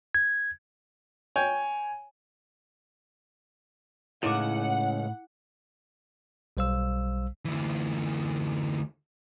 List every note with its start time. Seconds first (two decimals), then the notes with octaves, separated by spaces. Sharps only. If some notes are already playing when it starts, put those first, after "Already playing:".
0.15 G#6
1.36 C#5 G5 G#5
4.23 C#2 A2 C#3 D#4 E4 F#5 D6
6.57 B1 G3 C5 F5 E6
7.45 D2 E3